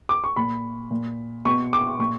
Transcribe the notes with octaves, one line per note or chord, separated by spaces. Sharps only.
D6
C#6
A#2 B5
A#2
B2 C#6
D6
A#2 C#6